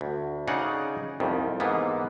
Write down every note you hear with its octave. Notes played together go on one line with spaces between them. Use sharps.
D2
C#3 D#4 G#4 D5 F#5
C2 F2 D#3
G#2 E3 A#3 B3